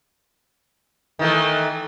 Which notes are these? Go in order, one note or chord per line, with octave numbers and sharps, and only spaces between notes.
D#3 E3 A3